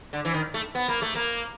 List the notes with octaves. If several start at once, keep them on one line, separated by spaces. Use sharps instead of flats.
D3
E3
D#3
A3
B3
A#3
A3
A#3